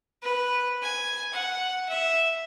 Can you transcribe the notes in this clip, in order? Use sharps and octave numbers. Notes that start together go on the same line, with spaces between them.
B4
G#5
F#5
E5